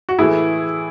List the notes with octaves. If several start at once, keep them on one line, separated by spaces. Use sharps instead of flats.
F#4
A2 E3 A3 E4 G#4